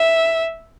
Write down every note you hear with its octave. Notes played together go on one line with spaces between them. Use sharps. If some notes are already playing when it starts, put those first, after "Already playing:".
Already playing: E5